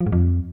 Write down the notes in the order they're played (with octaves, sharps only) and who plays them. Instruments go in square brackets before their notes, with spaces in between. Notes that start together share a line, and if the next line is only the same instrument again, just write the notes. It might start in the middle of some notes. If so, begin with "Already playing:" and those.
[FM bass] F3
G#2
F2